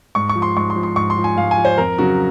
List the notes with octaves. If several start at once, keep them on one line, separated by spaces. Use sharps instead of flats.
G#2 C#6
C#6
F3
C6
G#2 C#6
C6
F3
C6
G#2 C#6
C6
F3
G#5
G#2 F5
G#5
F3
C5
F2 A#4
C#3 F#3 F#4